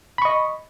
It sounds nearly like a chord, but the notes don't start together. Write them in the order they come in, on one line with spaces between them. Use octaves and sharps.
B5 C#6 D#5